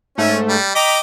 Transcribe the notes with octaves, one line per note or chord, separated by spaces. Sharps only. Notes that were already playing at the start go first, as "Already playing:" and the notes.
G#2 A3 C#4
G3
D#5 G5 A#5 D6 B6